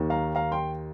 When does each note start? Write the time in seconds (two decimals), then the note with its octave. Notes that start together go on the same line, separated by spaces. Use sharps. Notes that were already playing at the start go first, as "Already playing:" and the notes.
Already playing: D#2 D#3 A#3
0.10 F5 A#5
0.35 F5 A#5
0.52 G5 C6